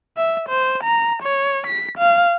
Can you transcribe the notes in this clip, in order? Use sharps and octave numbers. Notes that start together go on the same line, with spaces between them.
E5
C5
A#5
C#5
B6
F5